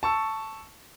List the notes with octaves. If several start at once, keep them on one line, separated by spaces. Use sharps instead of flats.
A5 C#6 E6